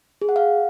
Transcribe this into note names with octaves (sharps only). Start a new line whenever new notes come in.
G#4
F#5
F5